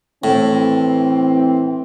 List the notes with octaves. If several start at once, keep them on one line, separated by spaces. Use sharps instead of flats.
A2 E3 C4